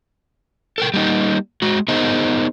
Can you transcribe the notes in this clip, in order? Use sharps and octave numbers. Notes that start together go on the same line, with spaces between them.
A4 A#4 G5
G3 A#3 C#4 D#4 G4
G#3 F#4
B3 D#4 G#4 A#4 C5 D#5